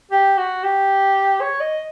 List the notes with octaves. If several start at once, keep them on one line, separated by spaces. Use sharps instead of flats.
G4
F#4
G4
C#5
D#5